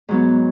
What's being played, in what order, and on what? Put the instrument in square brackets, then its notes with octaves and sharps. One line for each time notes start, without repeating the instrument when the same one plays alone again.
[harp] G#2 F#3 B3